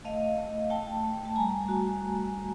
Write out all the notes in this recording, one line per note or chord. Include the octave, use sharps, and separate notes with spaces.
A3 D#5 F5
A3
A3 G5 A5
A3
A5
G3 G#5 A#5
F#4